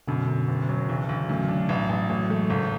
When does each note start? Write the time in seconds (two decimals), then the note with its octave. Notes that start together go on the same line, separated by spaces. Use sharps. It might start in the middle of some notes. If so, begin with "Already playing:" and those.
0.08 F#2 B2 D3
0.27 F#2
0.48 F#1
0.69 F#3
0.89 B1 C#3 E3
1.08 B1 D3 F#3
1.29 F#2 F#3 A3
1.48 D4
1.69 A1
1.89 A1
2.09 A1 F#3 A3
2.30 E3 G#3 A3
2.49 G#1 C#3